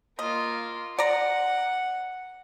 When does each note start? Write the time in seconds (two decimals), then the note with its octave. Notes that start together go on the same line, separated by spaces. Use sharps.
0.19 A#3 F4 D#5
0.99 D5 F#5 A#5